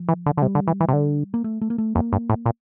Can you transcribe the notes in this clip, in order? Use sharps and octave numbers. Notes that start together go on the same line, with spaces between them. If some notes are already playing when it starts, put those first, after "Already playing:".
Already playing: F3
E3
D3
D3
C3 G3
D3
E3
E3
C3
D3
A#3
A3
A3
A#3
A3
F2 A#3
G2
A2
A#2